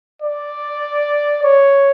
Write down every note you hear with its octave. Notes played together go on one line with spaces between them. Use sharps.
D5
C#5